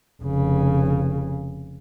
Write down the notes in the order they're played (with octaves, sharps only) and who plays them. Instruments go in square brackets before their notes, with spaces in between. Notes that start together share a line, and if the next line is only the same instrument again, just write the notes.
[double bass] F1 C#3